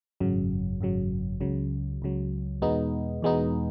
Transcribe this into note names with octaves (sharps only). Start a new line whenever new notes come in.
G#1 F#2 C#3 F#3
G#1 F#2 C#3 F#3
C#2 C#3 F#3
C#2 C#3 F#3
E2 B2 G#3 B3 D#4
E2 B2 G#3 B3 D#4